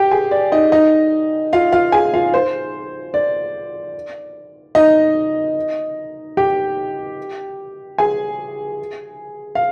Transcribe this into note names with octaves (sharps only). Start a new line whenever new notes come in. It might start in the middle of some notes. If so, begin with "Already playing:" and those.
Already playing: G4 G5
G#4 G#5
D5
D#4 D#5
D#4 D#5
F4 F5
F4 F5
G#4 G#5
F4 F5
C5
D5
D#4 D#5
G4 G5
G#4 G#5
F5